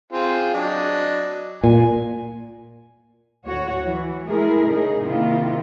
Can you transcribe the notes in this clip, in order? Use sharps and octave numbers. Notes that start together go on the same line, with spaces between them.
C4 F4 G#4
F#3 D4 D#5
A#2 G#5
D2 F#4 C#5
E3
G#3 A3 E4 G#4 A#4
C#3 D#4 G#4
C3 D#3 A#3 E4 F4